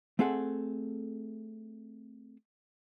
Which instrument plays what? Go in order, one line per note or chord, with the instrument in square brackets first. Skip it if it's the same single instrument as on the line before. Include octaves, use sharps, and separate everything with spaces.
[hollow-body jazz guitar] A3 C4 G#4 A4 F#5